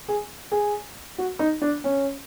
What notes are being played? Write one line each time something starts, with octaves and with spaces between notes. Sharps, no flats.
G#4
G#4
F#4
D#4
D4
C#4